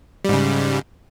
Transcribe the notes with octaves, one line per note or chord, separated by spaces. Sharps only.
G#2 C#3 G3